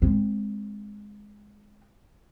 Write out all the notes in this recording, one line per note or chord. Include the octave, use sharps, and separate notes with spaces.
G#3 C4